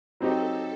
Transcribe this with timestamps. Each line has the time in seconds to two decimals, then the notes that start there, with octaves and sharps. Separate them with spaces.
0.20 F#3 C4 D#4 G4 A4